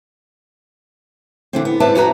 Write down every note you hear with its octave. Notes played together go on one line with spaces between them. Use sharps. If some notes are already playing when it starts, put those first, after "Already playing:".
D3 E3 C4
B3
G#2 C4 B4 D5 E5 A5
F2 F#4 B4 A#5